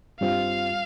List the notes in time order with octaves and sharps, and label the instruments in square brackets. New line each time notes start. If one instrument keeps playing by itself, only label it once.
[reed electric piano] G2 G3 C4 F4 [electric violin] F5